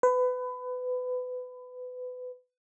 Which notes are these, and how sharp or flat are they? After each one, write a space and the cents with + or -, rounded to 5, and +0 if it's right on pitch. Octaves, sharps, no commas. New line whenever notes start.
B4 +25